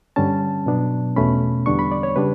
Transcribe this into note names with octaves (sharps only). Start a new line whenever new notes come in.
G2 D3 G3 C#4 A5
B2 F#3 B3 D4
E2 B2 A3 C#4 B5
E2 D3 G3 B3 D4 C#6
B5
D5
C#5
C#3 G3 D4 B4